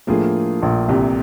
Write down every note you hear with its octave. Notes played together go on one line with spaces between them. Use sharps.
A2 F3 A#3 D4 F4 G#4
A#1 A#2
C2 C3